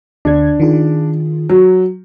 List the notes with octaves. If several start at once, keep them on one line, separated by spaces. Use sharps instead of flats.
D2 D3 D4 G#6
D#3 F4 G#4
F#3